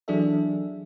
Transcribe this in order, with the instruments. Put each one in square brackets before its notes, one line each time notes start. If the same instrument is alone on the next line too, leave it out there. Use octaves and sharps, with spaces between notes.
[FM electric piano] E3 F#3 D4 G#4 A4 E5